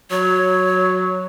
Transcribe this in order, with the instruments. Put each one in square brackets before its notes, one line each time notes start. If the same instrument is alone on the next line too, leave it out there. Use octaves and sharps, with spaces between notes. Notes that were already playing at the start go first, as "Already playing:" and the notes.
[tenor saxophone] F#3 [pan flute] C#5